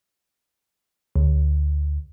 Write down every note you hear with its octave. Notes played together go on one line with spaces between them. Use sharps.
D2